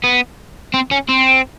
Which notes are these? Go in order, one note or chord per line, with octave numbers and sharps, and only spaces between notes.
B3
C4
C#4
C4